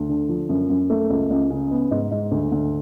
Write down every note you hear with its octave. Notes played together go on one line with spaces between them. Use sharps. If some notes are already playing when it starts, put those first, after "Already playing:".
Already playing: D2
D3
F3
F#2
F#2
A3
C#2
C#2
C#3
B3
G#2
G#2
D2
D2